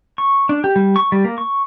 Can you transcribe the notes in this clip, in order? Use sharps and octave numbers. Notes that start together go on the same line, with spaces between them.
C#6
D4
G4
G3
C#6
G3
A#3
C#6